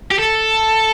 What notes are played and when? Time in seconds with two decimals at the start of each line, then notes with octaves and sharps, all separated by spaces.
0.11 G4
0.18 A4